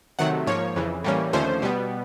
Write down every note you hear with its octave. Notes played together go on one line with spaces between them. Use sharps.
C3 D#3 F#3 A3 F#5
G#2 F3 A#3 C#5
F2 C#3 E3
A2 E3 G3 A#3 C#4
D#2 D3 F3 A3 C#4 C5
B2 G3 B3